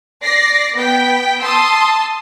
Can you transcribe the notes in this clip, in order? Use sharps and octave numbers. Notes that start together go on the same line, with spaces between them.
D5 A#6 C7
B3 G5 B6
A5 C6 D#6 E6